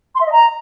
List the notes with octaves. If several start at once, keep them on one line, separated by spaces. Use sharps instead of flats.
C6
E5
D#5
A#5